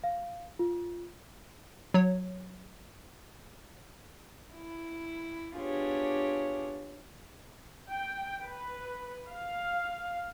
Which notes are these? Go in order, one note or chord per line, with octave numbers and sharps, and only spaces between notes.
F5
F4
F#3 C#5
E4
B3 D4 F4 G4 G#4 C#5
G5
B4
F5